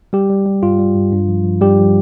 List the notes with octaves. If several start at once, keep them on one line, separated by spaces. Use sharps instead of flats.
G3 G4
G3
G3
G2 F4
G3
G2
G2
F3
F3
G2 G3 G4
F3